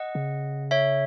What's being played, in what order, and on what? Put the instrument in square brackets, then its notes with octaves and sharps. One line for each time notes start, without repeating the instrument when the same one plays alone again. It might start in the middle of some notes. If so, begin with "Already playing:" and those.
Already playing: [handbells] D#5 F#5
[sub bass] C#3
[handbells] C#5 E5